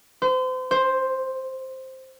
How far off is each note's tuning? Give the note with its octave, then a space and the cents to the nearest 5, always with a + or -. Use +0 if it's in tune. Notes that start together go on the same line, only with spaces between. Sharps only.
C5 -35
C5 +5